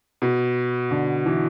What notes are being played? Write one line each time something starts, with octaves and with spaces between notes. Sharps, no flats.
B2
D3
E3